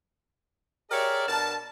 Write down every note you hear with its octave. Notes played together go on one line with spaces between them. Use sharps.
G4 G#4 A#4 C#5 D5 E5
B2 D4 A#4 A5